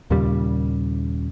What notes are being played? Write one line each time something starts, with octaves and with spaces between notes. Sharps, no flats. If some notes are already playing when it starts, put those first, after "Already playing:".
D#2 A#2 C#3 G3